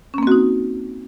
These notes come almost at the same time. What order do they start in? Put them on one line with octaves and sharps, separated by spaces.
C#4 A#3 C4 F#4 D#4